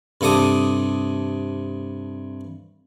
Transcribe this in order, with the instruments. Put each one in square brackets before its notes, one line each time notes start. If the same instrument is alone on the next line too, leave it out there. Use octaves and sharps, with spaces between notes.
[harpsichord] G2 C3 A4 D6 D#6